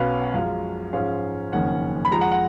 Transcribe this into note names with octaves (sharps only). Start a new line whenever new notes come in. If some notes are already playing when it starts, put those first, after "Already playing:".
Already playing: B1 B2 F#3 C#4 B4 F5
F#5
F#2 F3 G#3 F5
G#2 F3 G#3 C#4 F5
F#1 F2 D#3 A#3 C#4 F#5
B5
F2 F3 G#3 A#5
F#5
F#5